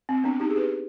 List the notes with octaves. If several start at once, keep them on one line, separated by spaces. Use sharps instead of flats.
C4
B3 D4
D#4 G4
G#4
G4 B4